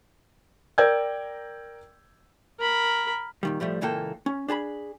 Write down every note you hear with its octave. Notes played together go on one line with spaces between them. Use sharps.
A#4 D5 G5 E6 G6 G#6
A#4 B5
A#2 D#3 G3
A2 F3 G3 A3
C#2 A#2 E3 A#3 A4 G5
C#4
D4 G#4 A5 B5